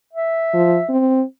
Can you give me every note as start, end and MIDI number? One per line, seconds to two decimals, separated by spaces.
0.13 0.91 76
0.53 0.78 53
0.89 1.23 60